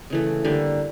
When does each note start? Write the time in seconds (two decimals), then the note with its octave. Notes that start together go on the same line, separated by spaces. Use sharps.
0.10 C#3 E3 A3
0.44 D3 G3 A#3